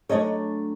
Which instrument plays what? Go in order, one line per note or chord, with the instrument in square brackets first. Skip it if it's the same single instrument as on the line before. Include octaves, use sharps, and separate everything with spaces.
[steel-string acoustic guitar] F#3 A3 D4 C#5 D#5